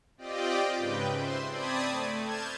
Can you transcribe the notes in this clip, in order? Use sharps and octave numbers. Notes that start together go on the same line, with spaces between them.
C4 F4 G4 D5 D#5 G5
G#2 C#3 B4 G5
C5 E5 C6
C4 D5 A5 B5 D#6 G#6
A3
A5 F6 G6 G#6 E7